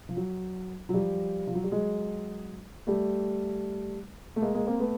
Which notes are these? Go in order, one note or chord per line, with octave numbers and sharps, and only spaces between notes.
F3
F#3
F#3
F3 G3
F3
F#3
G3
F#3 G#3
G3 A3
A3
G#3 A#3
G#3 A#3
A#3 C4
A3 B3